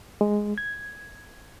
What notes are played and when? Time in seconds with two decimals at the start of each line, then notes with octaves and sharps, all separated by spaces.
0.21 G#3
0.58 G#6